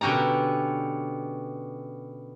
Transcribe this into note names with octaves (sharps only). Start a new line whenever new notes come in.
B2 D3 C#4 G4 A#5